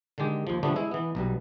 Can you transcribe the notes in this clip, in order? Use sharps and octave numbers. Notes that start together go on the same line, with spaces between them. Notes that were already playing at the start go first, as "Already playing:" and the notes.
D3 D#3 G#3 G4
D#2 F3
D3 F3 G3 A3 B3 D4
G#3 E4
E3 B3
B1 B2 G3